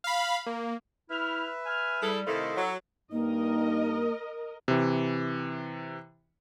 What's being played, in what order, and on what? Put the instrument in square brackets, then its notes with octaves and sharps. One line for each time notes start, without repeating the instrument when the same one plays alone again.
[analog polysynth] F5 B5
A#3
[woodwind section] E4 F6 [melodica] B4 E5
[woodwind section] G#5 F6
[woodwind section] G3 [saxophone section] E4 G#4 A4
[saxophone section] C3 D#3 A3 [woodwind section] E4 A4 [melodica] C5 D#5 F5
[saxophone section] F#3
[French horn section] G2 D#4 [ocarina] A#3 [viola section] A#4 D#5
[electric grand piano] C3 E3